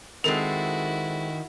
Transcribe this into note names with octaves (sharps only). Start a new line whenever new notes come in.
D#3 G#3 C4 E4 F#4 A4 A#4